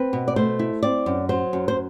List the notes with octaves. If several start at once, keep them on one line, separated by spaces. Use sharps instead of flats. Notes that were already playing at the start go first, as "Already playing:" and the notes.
Already playing: C4 B4
B2
D5
A3 C5
E4
C4 D5
F#2
F#3 C5
F#2
C5